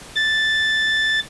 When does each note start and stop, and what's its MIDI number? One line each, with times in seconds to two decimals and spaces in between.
0.16 1.20 93